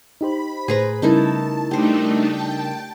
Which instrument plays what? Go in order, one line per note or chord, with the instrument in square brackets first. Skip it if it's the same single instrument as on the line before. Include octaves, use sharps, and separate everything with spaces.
[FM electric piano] D#4 G4 C5 [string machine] B5
[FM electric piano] A2 C5 [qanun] G#4 B4 A#5
[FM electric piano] C#3 G3 A#4 [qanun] A3 D#4 E4 [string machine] A5
[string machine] A3 D4 D#4 [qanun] G4 C5
[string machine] G5 A5